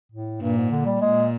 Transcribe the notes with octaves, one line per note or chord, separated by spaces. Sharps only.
A2
G2 A#2
G#2
D3
G3
A#2 G#3